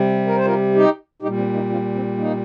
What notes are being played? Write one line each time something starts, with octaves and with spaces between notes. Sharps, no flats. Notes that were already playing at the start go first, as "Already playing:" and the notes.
Already playing: C3 G3
A#4
C5
F4 A#4
D#4 G4
A#2 G3 D#4 G4
C4
A#3 D#4
C4 F4
C4
A#3 D#4